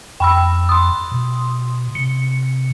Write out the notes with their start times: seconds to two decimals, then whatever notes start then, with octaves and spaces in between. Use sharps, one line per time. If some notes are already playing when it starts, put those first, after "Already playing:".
0.20 F2 G5 B5 E6
0.69 C6 D#6
1.11 B2
1.95 C3 C#7